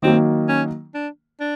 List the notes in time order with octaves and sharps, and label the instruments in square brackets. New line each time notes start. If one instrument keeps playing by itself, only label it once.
[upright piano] D#3 F#3 A#3 [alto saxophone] C4
[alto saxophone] C#4
D4
D4